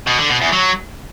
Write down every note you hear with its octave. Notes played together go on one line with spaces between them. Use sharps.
B2
D3
B2
E2
F#3